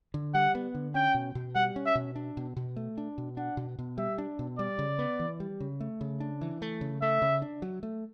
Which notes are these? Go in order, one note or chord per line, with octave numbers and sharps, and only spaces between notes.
D3
G3 F#5
B3
D3
C#4 G5
B2
B2
G3 F#5
C#4
E5
B2
D4
B2
B2
A3
D4
B2
D4 F#5
B2
B2
G3 E5
D4
B2
G3 D5
C#3
B3
E3
G3
C#3
A3
C#3
D4
E3
A3
C#3
A3 E5
C#3
D4
F#3
A3